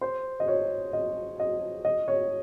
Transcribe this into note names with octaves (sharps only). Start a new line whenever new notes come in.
C5
D#5
C#5
D#5
D#5
D#5
C#5